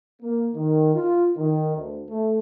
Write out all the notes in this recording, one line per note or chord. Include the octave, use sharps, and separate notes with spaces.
A#3
D#3
F4
D#3
D2
A3